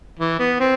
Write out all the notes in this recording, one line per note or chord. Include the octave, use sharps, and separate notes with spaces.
E3
B3
C4